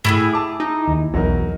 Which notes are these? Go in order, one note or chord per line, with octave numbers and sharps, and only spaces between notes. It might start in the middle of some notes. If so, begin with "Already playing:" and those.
A2 E4 F4 G#4
A5 D6
D#4
D#2
B1 E2 F#3 D#4 A#4